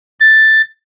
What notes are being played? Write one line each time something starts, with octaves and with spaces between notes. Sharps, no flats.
A6